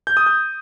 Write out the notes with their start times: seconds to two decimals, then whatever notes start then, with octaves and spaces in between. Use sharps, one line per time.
0.07 G6
0.17 D#6
0.26 G6